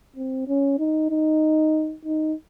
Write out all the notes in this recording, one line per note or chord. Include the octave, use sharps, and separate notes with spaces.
C4
C#4
D#4
D#4
D#4